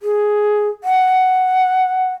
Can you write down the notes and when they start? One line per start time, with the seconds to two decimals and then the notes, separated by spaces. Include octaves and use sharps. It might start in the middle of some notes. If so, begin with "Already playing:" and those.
0.02 G#4
0.84 F#5